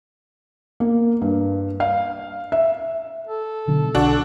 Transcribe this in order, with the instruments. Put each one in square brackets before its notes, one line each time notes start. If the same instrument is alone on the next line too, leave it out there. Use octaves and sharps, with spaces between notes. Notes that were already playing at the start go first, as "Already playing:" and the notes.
[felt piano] A#3
G2
F5
E5
[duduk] A4
[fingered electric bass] B2 D3 F#3
[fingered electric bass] B1 [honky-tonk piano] D4 F#4